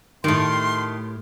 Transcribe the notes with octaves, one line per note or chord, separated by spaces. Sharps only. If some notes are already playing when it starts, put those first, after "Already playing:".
A2 D#3 A3 G4 C6